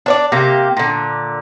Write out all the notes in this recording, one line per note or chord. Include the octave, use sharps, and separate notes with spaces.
D4 C#5 D5
C3 A#3 G4
A#2 D3